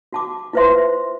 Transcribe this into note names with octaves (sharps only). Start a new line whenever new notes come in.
F#4 A5 D6
E4 F4 B4 C5 E5 C6